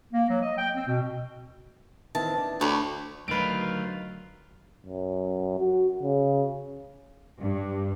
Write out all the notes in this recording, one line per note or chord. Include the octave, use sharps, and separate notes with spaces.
A#3
F#3
D#5
G5
C4
B2
D#3 E3 C4 A5
D4
D2 C#5 B5
D2 D#3 F#3 F4 B4 D7
F#2
F#4
C#3
G2